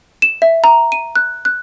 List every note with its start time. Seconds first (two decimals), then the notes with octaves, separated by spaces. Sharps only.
0.22 E7
0.42 E5
0.64 A#5
0.92 D#7
1.16 F#6
1.45 F#6